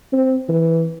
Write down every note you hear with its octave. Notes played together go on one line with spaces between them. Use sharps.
C4
E3